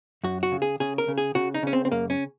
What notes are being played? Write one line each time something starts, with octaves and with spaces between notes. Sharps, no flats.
F#2 F#4
F#4
C#3
G#4
C#3 G#4
A#4
C#3
G#4
C#3 F#4
D#4
C#3 C#4
C4
C4
F#2 A#3
C#4